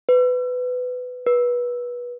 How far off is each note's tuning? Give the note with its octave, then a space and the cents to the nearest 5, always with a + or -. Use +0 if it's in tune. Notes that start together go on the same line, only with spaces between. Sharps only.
B4 +20
B4 -25